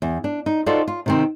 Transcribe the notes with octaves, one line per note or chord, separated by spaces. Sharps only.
E2
D4
D#4
D#4 F4 F#4 A4 C5 D5
F4
C3 D#3 C4